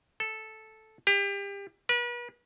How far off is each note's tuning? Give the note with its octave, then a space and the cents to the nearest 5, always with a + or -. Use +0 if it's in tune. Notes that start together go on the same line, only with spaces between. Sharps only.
A4 -5
G4 +30
B4 -40